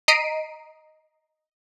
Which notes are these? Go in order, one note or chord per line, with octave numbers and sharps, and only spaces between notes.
D#5 A#5 B6 C7 D7 D#7